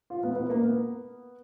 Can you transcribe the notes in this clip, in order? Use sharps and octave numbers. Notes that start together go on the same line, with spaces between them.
F4
B3
B3
A#3
B3